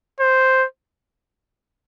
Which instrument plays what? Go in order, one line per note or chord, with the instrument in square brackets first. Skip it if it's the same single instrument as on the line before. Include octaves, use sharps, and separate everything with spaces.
[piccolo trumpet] C5